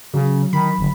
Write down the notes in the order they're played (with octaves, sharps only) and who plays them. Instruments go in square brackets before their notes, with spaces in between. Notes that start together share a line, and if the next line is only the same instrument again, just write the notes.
[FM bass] C#3 [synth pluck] F#3
[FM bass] D#3 [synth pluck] B5
[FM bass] G1